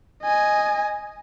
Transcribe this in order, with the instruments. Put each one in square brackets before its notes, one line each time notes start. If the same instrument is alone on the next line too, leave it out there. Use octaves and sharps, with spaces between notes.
[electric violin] D#5 G#5